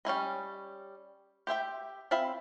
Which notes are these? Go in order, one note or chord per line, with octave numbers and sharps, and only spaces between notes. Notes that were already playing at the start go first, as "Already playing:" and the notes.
G3 C#4 E4 D#5
G4 C5 E5 G5
C4 F4 E5 B5